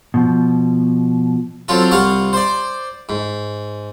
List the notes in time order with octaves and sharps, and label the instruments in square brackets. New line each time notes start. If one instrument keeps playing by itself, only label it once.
[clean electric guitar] B2 F3
[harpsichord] F#3 C4 F4 A4
C2 F4 F5 F#5 C#6
C5 D5
G#2